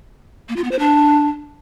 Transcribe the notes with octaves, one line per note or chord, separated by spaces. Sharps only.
A#3
F4
B3
C5
D4